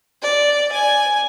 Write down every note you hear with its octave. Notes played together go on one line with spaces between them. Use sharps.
D5
G#5